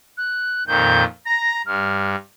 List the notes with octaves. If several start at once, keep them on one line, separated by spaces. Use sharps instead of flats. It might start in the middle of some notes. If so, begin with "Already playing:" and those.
F#6
F2 A#2 D#3 G6
A#5 A#6
G2 F6